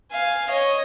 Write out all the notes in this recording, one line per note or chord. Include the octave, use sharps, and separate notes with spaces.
F5 G#5
C#5 D#5